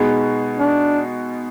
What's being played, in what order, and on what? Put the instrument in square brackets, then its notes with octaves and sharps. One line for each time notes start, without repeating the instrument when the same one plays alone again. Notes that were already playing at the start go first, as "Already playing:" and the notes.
Already playing: [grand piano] B2 G#3 B3 D#4 G#4
[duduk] D4